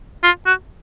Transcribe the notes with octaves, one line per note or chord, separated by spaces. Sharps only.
F4
F#4